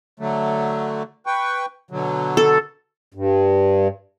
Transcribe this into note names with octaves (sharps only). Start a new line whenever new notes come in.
D3 F#3 A3
B4 G5 C#6
B2 D3 F#3
A4
G2